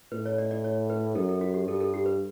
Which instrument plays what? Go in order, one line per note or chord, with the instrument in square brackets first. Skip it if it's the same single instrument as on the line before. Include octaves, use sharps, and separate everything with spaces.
[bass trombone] A2 [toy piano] B4
[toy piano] C#5
D5
D5
C#5
B4
[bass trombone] F#2 [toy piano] A4
[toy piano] A4
F#4
G4
[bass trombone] G2 [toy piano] A4
[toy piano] A4
G4
B4